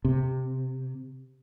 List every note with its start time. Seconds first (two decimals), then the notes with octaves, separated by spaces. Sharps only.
0.05 C3